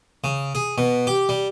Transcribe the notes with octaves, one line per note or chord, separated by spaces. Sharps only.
C#3
G#4
B2
G4
G3